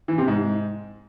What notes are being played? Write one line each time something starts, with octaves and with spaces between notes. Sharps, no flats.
E3
C3
G#2